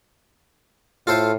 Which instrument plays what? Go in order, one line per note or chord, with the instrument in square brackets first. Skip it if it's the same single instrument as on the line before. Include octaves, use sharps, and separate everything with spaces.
[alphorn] A2 [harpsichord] F4 A4 C5